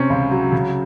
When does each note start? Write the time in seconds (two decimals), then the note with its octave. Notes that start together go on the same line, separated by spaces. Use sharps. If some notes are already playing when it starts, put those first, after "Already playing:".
Already playing: C3 C4 C#4
0.10 C#2
0.31 F#3
0.52 C#3